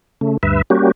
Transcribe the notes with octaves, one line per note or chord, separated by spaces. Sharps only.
C#3 A3
D2 G2 B4 E5
G3 A#3 C#4 F#4 G4